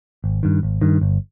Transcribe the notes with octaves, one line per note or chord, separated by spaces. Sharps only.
G#1
G2 D#3
G#1
G2 D#3
G1